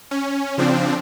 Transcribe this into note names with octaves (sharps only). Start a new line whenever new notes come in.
C#4
C#3 F3 C4 D4